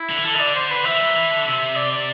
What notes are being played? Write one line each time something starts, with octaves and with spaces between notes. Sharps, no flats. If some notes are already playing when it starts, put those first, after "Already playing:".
Already playing: E4
D3
E3
D3 A4
E5
D5
C5
B4
E3 E5
F#3
E3
D3
C3 E5
D5
D5